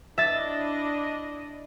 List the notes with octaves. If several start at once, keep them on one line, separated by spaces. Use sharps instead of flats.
D4 E4 D#5 E5 A6